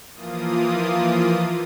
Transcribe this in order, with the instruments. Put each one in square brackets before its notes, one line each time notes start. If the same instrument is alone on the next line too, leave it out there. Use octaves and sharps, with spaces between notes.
[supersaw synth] E3 F3 A#3 F4 D#6